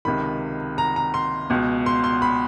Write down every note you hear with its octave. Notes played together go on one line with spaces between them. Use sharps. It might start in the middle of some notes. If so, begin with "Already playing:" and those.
C#2 C3 D#3 B5
A#5
A#5
C6
C#2 B2
C6
C6
B5